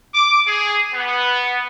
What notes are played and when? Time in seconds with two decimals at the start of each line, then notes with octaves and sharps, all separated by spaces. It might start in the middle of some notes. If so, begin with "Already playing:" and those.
0.13 D6
0.46 G#4
0.94 B3